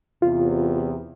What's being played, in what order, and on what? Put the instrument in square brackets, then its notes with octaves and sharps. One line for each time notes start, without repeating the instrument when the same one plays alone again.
[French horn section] E2 C3 [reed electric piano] F4